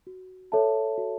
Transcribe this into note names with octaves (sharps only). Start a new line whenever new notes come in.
F#4
A4 C#5 E5 A5
F#4